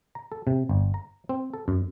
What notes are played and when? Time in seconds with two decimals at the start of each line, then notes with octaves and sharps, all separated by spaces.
0.15 A#5
0.32 A4
0.47 C3
0.69 G1
0.94 A#5
1.29 C4
1.54 A4
1.68 F#2